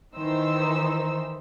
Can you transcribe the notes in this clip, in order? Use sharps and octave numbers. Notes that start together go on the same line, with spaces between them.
D#3 E3 D#4 C5 E6